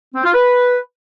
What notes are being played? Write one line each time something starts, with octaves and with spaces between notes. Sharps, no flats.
C4
F4
B4